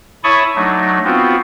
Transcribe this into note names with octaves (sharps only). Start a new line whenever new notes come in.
E4 C#5 A5 B5 C#6 D#6
F#3 A3 D4 D#4
B3 C4 F4 F#4